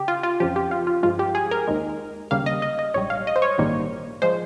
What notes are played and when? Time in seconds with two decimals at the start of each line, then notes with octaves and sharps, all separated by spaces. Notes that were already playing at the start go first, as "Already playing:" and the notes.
Already playing: C#3 G4
0.08 F4
0.23 F4
0.40 F2 C#3 F3 G4
0.56 G4
0.71 F4
0.87 F4
1.03 G2 F3 G#3 F4
1.19 G4
1.35 G#4
1.51 A#4
1.68 D#2 D#3 G#3
2.31 D#2 C#3 G3 A#3 F5
2.46 D#5
2.62 D#5
2.79 D#5
2.94 A#1 G#2 G3 C#5
3.10 F5
3.27 D#5
3.36 C5
3.42 C#5
3.58 A#1 G#2 D#3 G3 A#3
4.22 F3 G#3 C5